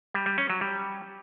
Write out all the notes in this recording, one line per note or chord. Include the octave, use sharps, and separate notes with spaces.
G3
G3
C#4
F#3
G3